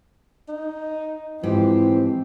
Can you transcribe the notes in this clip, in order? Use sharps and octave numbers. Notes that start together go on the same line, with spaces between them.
D#4
G#2 E3 F3 C4 G4